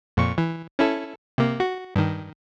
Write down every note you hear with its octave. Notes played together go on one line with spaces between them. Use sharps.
F2 A#2 C#6
E3
C#4 E4 A4
C3 A#3
F#4
G2 D#3